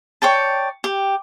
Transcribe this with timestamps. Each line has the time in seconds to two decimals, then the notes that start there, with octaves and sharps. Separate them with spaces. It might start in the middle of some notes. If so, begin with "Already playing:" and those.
0.22 C#5 D5 G5 A5
0.84 G4